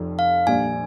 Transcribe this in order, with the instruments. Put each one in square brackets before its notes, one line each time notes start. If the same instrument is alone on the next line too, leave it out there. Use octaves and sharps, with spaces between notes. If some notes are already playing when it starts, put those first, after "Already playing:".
Already playing: [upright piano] F1 F2 C3
[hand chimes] F5
[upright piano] A#1 A#2 G3 D4 [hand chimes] G#5